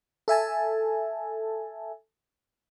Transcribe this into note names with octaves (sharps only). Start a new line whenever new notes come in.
A4 E5 G#5 A5